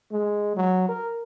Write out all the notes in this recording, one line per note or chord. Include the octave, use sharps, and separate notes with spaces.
G#3
F#3
A#4